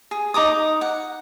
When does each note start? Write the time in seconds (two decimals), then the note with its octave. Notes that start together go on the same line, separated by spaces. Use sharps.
0.11 G#4
0.34 D#4 A#5 D6 D#6
0.81 F#5